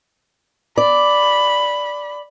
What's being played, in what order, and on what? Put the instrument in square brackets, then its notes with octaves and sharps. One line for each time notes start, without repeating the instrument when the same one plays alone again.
[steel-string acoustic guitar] D5 [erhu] B5